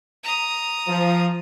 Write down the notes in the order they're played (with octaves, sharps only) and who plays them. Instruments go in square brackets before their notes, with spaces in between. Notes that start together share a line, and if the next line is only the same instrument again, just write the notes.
[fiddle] A#5 D#6
[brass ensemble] F3